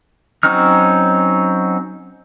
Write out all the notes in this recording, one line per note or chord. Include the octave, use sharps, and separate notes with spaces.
F#3 C4 C#4 D#4 F6